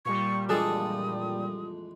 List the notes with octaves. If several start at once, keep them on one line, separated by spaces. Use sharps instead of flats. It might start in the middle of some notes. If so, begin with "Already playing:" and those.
A#2 G3 C#6
F2 E3 G#3 D4 G#4 A4 D#6